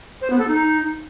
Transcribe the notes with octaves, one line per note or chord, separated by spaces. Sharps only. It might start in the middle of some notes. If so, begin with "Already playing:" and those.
C5
B3
A4
D#4